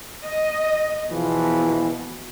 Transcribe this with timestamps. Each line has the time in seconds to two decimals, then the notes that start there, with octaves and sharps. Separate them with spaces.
0.25 D#5
1.11 E2 B2 E3 F3